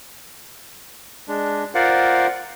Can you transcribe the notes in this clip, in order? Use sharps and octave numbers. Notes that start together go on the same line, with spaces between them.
G#3 D4
F4 A#4 C5 D5 F5 F#5